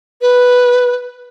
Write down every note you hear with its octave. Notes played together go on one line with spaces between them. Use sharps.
B4